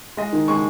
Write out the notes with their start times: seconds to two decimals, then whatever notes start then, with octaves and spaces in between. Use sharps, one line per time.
0.17 G#3 D#5
0.33 D#3
0.48 G#3 C#6